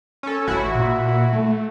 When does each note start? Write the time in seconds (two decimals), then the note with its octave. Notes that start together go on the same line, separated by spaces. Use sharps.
0.23 C#4 A4
0.47 A1 E4 F#4
0.75 A#2
1.33 A3